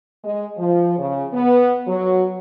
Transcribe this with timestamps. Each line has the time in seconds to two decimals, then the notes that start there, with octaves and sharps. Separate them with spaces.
0.25 G#3
0.58 F3
0.98 C#3
1.33 B3
1.88 F#3